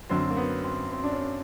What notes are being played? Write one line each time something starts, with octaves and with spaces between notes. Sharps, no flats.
F#2 D3 F#3 C4
A#3
B3
C4
C4
D4
C#4